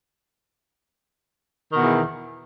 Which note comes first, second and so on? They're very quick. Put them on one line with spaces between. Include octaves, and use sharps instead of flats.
D#3 B2 E2